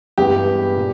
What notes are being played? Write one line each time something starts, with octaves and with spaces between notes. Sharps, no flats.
G2 E3 G#3 B3 G4
A#2